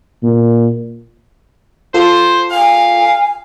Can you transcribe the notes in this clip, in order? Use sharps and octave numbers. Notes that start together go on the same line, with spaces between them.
A#2
F4 A4 C5
F5 G#5